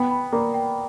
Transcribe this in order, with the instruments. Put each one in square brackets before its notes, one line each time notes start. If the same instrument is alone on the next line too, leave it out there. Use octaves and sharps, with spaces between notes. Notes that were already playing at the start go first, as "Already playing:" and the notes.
Already playing: [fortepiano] B3 [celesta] G5
[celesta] B5
[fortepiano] A#3 [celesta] D5
[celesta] G5